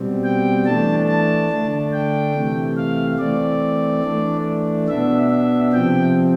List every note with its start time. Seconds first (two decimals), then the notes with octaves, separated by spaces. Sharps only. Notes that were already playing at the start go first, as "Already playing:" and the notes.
Already playing: B2 G3 C4
0.24 G5
0.65 E3 A3 D4 A5
1.08 A5
1.50 D3 A3 D4
1.92 G5
2.34 C3 E3 A3
2.77 F5
3.19 E3 A3 C4 D5
4.03 E3 A3 D4
4.88 B2 B3 D4 E5
5.30 E5
5.72 C3 F3 C4 G5